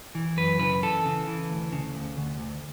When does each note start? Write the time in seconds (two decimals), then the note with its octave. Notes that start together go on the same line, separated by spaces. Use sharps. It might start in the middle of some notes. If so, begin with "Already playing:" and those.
0.15 E3
0.37 F#2 B4
0.60 C#3 B4
0.82 E3 A4
1.06 C#3
1.27 E3
1.50 D2
1.72 C#3
1.95 D2
2.17 D2
2.40 D2